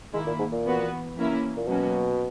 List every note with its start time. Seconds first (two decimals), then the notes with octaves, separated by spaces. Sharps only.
0.13 D#3 G#3 A#3 E4
0.27 A#2
0.39 G#2
0.52 A#2
0.65 E3 B3 F#4 B4
1.16 E3 A#3 C#4 E4 A#4
1.57 A#2
1.67 B2 F#3 A#3 C#4 F#4